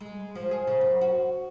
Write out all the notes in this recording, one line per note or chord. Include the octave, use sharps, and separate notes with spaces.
G#3
F3
G#4
C#3
F#2
F#4